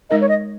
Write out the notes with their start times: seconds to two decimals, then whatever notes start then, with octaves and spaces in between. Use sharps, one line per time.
0.10 G#3 D#4 A#4 D#5
0.21 C#5
0.29 D#5